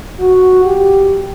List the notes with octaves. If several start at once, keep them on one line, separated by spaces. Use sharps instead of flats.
F#4
G4